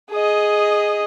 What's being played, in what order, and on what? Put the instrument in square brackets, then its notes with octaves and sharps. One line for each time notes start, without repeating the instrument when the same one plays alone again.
[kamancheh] G#4 D#5